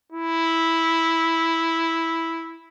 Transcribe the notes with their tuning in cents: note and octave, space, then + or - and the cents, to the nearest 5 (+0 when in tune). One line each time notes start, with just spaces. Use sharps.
E4 -5